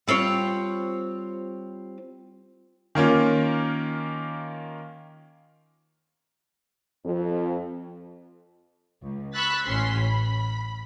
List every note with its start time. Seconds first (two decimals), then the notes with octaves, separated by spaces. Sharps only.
0.07 G3 C4 F4 C#5
2.95 D#3 A#3 C#4 F4
7.05 F2
9.02 C#2
9.33 B5 C#6 E6 F#6 A6 B6
9.64 A1 C#4 C6 B6
10.04 B5